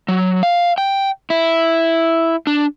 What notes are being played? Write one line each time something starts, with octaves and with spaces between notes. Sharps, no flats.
F#3
F5
G5
E4
D4